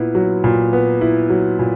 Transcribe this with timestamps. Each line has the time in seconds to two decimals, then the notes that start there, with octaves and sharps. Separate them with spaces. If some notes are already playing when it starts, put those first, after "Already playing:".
Already playing: A#2 B3 E4
0.15 F#3
0.44 A#2
0.73 B3
1.01 E4
1.30 F#3
1.59 A#2